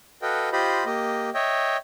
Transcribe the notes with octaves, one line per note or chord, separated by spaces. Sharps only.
F#4 A4 B4 D#5 F5 G5
F4 G4 C5 D#5 B5
A#3 G4 D#5
C#5 D#5 E5 G5